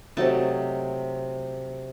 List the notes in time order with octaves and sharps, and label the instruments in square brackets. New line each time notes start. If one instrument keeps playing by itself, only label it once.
[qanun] C3 F#3 A3 D#4 A5